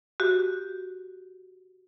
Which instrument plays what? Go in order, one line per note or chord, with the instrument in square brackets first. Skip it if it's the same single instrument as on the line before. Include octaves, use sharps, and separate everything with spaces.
[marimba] F#4 G4